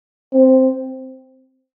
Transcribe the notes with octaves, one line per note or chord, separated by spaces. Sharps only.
C4